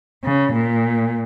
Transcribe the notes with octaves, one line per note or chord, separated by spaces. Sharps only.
C#3
A#2